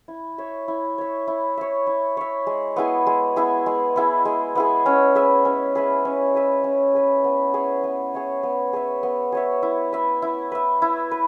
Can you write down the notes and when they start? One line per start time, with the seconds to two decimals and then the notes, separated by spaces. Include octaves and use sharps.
0.08 E4
0.38 C#5 E5
0.68 E4
0.98 C#5 E5
1.28 E4
1.57 C#5 E5
1.87 E4
2.17 C#5 E5
2.47 G#3
2.76 B3 E4 G#4
3.07 G#3
3.36 B3 E4 G#4
3.66 G#3
3.96 B3 E4 G#4
4.25 G#3
4.55 B3 E4 G#4
4.86 C#4
5.15 G#4 B4 E5
5.45 C#4
5.75 G#4 B4 E5
6.05 C#4
6.35 G#4 B4 E5
6.64 C#4
6.94 G#4 B4 E5
7.24 B3
7.54 G#4 C#5 E5
7.84 B3
8.14 G#4 C#5 E5
8.43 B3
8.73 G#4 C#5 E5
9.03 B3
9.32 G#4 C#5 E5
9.63 E4
9.93 B4 E5
10.22 E4
10.52 B4 E5
10.82 E4
11.11 B4